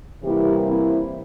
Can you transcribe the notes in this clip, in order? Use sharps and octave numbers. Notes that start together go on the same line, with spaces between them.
C3 E3 G3 A#3 E4 G4
C4 E4